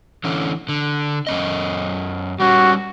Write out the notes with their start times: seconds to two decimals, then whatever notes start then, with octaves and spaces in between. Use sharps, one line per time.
0.24 D3 E3 C#4
0.69 D3
1.27 F#2 C#4 D#5
2.40 G3 C#4 F#4